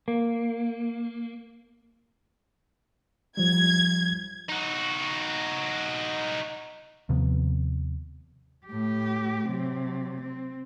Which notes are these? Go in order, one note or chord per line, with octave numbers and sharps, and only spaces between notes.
A#3
F3 G3 G#6
D#4 F#4
D#2 C3 F3 B3
A2 G4
C3 F#3
C4